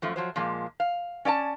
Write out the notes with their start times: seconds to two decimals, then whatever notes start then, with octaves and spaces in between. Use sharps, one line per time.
0.02 F#2 F3 A3
0.16 F3 F#3 C5
0.36 A#2 F3 G#3 A#3
0.80 F5
1.25 C#4 D5 E5 A5